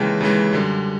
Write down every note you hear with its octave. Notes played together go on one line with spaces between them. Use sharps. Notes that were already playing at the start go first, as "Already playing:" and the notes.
Already playing: D#2 C#3 E3 G#3 G5 A5
D#2 C#3 E3 G#3
F#2 D3 G3